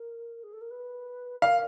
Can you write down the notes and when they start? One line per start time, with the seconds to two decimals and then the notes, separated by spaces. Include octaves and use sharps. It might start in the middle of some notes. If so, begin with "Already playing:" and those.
Already playing: A#4
0.43 G#4
0.52 A4
0.61 A#4
0.70 B4
1.42 A#4 F5